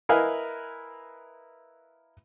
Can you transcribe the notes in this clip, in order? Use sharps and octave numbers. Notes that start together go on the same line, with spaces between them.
E4 A#4 B4 D#5 F5 G#5